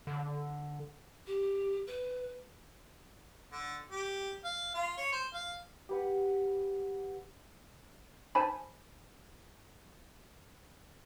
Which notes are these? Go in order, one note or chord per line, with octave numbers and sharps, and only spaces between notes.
D3
G4
B4
D3
G4
F5
F4
C#5
C5
F5
G4 B4 F#5
C5 G#5 A5 B5